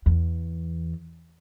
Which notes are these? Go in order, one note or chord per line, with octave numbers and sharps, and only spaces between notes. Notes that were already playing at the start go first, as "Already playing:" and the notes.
E2